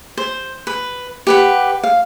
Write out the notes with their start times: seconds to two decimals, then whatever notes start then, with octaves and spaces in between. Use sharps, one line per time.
0.17 C5
0.67 B4
1.27 G4 B4 F#5
1.83 F5